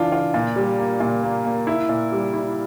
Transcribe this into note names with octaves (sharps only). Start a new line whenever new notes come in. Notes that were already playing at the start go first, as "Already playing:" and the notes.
Already playing: E3 D4 F4
F4
A#2
G3
A#3
A#2
A#3
A#3
E4
A#2
G3
E4